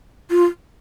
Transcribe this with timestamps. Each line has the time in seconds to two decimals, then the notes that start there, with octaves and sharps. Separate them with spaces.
0.30 F4